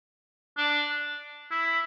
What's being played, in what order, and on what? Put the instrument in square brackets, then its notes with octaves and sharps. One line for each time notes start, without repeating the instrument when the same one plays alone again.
[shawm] D4
E4